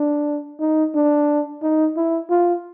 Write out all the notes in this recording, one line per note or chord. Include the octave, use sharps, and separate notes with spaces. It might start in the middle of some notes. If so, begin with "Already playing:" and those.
Already playing: D4
D#4
D4
D#4
E4
F4